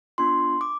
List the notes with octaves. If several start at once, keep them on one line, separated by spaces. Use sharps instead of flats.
B3 D4 F4 C6
D6